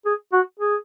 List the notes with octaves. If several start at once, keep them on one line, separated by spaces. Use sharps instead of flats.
G#4
F#4
G#4